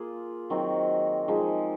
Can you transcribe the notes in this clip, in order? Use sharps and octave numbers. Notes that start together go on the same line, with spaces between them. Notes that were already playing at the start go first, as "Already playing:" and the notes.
Already playing: A#3 F4 G#4
D#3 F#3 C4 F#4
F3 G#3 D#4 G#4